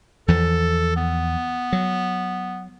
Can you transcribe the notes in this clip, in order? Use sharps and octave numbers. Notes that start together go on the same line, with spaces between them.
E2 E3 F3 A4
B3
F#3